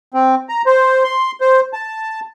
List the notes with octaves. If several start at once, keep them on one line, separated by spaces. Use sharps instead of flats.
C4
A#5
C5
C6
C5
A5